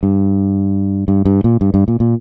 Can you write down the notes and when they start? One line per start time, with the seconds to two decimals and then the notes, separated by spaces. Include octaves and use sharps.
0.03 G2
1.08 G2
1.25 G2
1.44 A#2
1.61 G2
1.74 G2
1.88 A#2
2.00 A#2